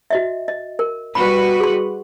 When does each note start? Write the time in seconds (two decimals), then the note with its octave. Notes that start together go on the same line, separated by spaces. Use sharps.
0.10 F#4 D#5 E5
0.48 D#5
0.79 A#4
1.15 G3 F#4 B4 B5
1.60 G#4 C6